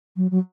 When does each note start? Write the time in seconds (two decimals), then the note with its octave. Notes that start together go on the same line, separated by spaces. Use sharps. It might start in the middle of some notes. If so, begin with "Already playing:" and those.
0.17 F#3
0.31 F#3